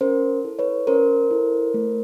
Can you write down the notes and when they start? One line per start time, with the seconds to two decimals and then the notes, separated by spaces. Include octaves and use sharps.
0.01 C#4 A#4 C5
0.44 E4 A4
0.59 B4 C#5
0.87 C#4 A#4 C5
1.31 E4 A4
1.74 A3